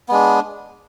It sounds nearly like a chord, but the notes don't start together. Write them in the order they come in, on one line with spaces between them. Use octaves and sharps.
B3 G#3 D4